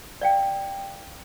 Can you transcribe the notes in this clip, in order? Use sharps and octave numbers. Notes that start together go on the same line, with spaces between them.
D5 F5 G5